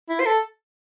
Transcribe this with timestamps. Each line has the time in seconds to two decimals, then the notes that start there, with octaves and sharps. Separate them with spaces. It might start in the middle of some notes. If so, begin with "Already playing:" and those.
0.09 E4
0.20 C5
0.26 A4